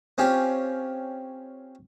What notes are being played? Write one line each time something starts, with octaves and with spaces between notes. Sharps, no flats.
C4 C#4 F4 G4